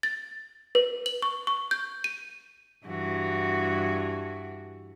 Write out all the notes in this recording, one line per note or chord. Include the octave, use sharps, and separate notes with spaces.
A6
B4
F#7
C#6
C#6
G6
D#7
G2 E3 F#4